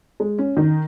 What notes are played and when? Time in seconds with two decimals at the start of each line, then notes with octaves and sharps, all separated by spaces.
0.20 G#3
0.38 C#4
0.57 D#3